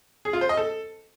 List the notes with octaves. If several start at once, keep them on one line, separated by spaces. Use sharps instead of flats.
G#4
F4
C5
D#5
A4